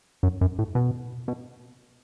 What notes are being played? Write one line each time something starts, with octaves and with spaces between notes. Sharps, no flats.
F#2
F#2
A2
B2
B2